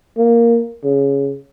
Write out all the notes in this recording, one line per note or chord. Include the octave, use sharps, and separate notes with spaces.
A#3
C#3